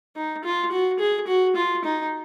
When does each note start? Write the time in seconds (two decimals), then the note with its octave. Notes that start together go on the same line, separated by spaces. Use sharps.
0.16 D#4
0.44 F4
0.72 F#4
0.99 G#4
1.27 F#4
1.56 F4
1.84 D#4